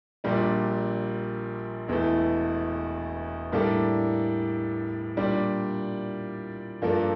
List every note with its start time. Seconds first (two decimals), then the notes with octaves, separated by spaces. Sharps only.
0.24 A#1 A#2 G3 D4
1.88 E1 E2 E3 A3
3.52 A2 G3 A#3 D4 A4
5.17 A#2 G3 D4
6.82 G2 F3 A#3 D4 A4